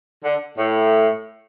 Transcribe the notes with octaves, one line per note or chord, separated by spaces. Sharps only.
D3
A2